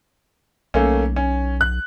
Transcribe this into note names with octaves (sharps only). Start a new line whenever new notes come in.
B1 A3 A#3 C#4
C#4
F#6